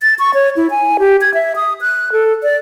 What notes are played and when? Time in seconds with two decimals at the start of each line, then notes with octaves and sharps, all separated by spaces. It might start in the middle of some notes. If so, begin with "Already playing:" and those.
0.02 A6
0.19 C#6
0.34 C#5
0.57 E4
0.71 G#5
0.99 G4
1.21 G#6
1.34 E5
1.56 D#6
1.81 F#6
2.12 A4
2.43 D5